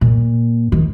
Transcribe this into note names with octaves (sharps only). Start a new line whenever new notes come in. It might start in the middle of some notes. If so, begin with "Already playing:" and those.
A#2
D#3